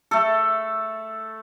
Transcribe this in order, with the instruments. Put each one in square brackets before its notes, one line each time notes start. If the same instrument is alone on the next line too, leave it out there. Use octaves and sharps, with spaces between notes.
[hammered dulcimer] A3 A4